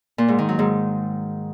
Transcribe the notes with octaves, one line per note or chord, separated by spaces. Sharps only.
A#2
G#2
D#3
F#3
G#2